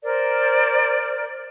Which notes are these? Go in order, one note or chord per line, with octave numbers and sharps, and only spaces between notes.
A#4 C5 D5